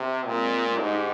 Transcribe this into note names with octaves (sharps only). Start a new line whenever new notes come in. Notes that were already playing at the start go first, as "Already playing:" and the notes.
Already playing: C3
A#2 G#3 C4
G#2 D#4 G4